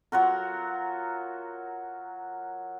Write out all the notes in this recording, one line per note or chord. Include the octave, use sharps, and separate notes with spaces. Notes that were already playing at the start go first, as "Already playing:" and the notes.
F#3 F4 F#4 A#4